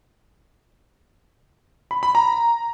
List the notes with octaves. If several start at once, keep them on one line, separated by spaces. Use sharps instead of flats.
B5
B5
A#5